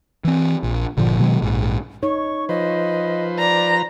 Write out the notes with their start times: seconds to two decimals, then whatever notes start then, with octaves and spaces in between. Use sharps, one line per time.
0.25 E3 C4
0.63 A#1
0.97 G1 A#2 D3 F3
1.19 B2 D#3 F#3 G#3
1.42 A#1 G#2
2.03 D#4 C#5 C#6
2.49 F3 B4 C5 D#5
3.39 D5 A#5